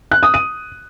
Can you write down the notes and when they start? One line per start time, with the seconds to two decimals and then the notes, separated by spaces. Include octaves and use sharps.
0.11 F#6
0.23 D#6
0.34 D#7